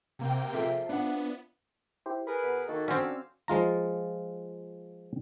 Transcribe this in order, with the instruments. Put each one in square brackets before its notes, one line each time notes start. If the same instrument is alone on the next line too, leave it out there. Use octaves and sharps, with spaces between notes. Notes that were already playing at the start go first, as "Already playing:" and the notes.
[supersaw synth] C3 A#3 G5
[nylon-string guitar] F3 G#4 A4 [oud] F4 C5 E5
[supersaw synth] B3 [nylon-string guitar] D4 F#5
[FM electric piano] E4 G4 C5
[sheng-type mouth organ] G#4 A#4 B4 [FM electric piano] B5
[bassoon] B2
[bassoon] D#3 [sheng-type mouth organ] A#3 F#4 A4
[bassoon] D3 [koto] C4 C#4 [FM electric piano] F#4 D5 [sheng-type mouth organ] F5 E6
[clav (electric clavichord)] F3 G#3 F4 A#5